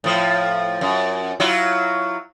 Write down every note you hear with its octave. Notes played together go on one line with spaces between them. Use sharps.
A2 F3
F#2
F#3 E4 F4